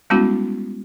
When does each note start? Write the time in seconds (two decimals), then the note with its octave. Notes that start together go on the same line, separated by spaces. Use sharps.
0.10 G3 G#3 B3 C#4 E4 F#4